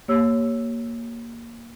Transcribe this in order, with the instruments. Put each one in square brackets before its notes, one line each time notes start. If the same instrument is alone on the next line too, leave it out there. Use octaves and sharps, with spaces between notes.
[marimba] A#3 G4 C#5 E6